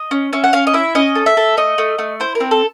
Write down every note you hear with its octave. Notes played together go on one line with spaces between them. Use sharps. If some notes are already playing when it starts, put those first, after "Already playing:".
Already playing: D#5
C#4
C#4 E5
F#5
C#4 F5
D#5
E4 E5
C#4 D#5
A4
E5
A4
A3 D#5
A3
A3
E4 C5
A#4
C4
A4